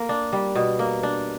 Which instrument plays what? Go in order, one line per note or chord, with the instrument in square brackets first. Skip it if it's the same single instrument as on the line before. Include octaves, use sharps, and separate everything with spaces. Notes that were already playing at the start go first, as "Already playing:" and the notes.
Already playing: [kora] A#3
D4
G3
B2
A#3
D4